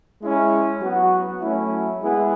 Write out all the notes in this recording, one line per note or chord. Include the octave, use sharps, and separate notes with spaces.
G#3 C#4 E4
F#3 B3 F#4
F#3 A3 C#4 E4
G#3 B3 E4 G#4